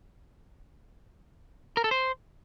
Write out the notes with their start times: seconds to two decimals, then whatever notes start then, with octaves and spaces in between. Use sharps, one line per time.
1.77 A#4
1.84 A4
1.91 C5